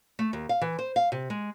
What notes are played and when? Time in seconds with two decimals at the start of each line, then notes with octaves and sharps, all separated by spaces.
0.19 A3
0.33 D#2
0.49 F5
0.61 E3
0.79 C5
0.96 F5
1.12 C3
1.30 G#3